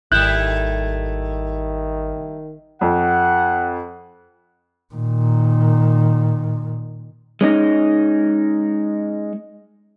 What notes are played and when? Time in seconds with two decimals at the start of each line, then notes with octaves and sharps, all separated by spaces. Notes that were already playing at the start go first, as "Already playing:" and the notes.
0.12 G#1 D#3 G3 A3 E4 F#6 G6
2.81 F2 F#5
4.95 A#2 D#3
7.41 G#3 C#4 D#4